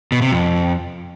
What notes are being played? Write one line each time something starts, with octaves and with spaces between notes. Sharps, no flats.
B2
C3
F2